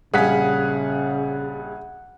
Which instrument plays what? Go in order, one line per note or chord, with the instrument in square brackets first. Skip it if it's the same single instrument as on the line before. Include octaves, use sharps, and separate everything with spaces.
[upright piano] A#1 G3 B6 [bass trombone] C#3 [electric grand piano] G#4 F5 G#5 [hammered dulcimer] F#5